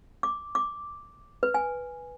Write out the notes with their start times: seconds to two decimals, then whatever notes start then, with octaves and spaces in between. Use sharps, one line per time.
0.23 D6
0.55 D6
1.43 B4
1.54 G#5